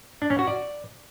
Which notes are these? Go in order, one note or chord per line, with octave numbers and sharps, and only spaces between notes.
D4
C#4
F#4
D5